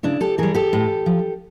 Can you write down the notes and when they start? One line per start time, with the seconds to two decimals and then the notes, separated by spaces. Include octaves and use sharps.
0.03 C#3 D4 E4
0.21 G4 A4
0.38 E3 G3 G#4 A#4
0.55 G4 A4
0.73 A2
1.06 F3